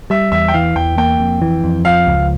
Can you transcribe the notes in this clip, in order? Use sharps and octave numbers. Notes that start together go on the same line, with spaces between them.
G3 E5
E2 E5
G5
E3 F5
E2 G5
A#3 G5
F2
E3
F2
F3 F5
C#2